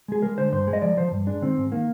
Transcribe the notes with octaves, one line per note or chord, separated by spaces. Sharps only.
G#3 G#4
G#3 A#4
D3 C5
G2 C5
G#3
D#5
F3 D5
F3 C5
G2
G#3 D4
D#3 C4
G#2
D#3 A#3